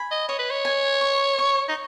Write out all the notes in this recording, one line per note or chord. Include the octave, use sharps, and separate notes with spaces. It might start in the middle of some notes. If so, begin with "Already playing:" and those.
Already playing: G#5 B5
D#5
C#5 D#5
B4
C#5
G#5
C#6
C#6
D#4